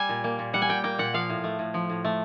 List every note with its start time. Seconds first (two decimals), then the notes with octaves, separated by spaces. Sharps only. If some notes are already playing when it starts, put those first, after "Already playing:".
Already playing: G3 G#5
0.09 A#2
0.24 A#3
0.39 A#2
0.53 G3 F#5
0.62 G#5
0.69 A#2 G5
0.84 A#3 G5
0.98 A#2 F#5
1.14 F3 F5
1.29 A2
1.44 A3
1.59 A2
1.74 F3
1.90 A2
2.04 A3